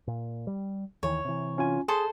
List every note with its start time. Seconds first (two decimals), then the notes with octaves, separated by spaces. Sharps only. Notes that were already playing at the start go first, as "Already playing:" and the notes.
0.07 A#2
0.47 G3
1.03 D#2 D#3 E3 C#5
1.25 C3 E3
1.58 C#4 F4 G#5
1.88 G#4 A4 C5 C6